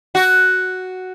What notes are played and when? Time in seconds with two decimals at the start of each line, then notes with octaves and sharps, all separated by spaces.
0.15 F#4